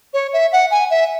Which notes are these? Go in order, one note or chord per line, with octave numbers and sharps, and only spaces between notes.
C#5
E5
F#5
G#5
E5